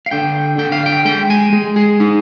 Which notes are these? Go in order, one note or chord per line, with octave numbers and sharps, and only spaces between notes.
F5
D3 G5
D3 G5
F5
G5
G#3 G5
G#5
G#3
G#4
D#4